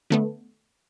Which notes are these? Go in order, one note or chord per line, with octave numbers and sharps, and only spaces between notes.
D3 A3 B3